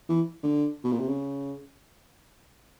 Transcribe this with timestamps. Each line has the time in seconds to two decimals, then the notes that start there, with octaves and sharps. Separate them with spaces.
0.09 E3
0.43 D3
0.84 B2
0.92 A#2
0.99 C3
1.08 C#3